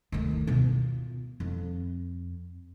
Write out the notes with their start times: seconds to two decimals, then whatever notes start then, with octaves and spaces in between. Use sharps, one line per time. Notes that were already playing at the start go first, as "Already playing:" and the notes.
0.12 D2 D#3
0.47 B2 F4
1.40 F2